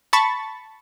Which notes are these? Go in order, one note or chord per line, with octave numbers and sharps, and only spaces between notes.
A5 B5 C#6 A6